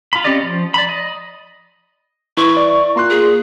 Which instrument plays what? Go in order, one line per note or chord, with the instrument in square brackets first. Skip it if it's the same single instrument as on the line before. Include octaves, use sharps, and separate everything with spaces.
[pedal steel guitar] F4 B5
C4 C#4 G4 D5 D#5
F3
D5 B5
D#5
[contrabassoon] E3 [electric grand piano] E4 [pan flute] C#6
[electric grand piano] D5
[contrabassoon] A#2 [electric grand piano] A#5 C6 F#6
[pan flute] G#4